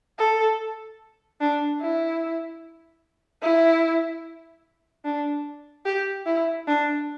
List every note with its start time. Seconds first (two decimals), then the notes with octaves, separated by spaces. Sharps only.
0.19 A4
1.40 D4
1.81 E4
3.42 E4
5.05 D4
5.85 G4
6.26 E4
6.67 D4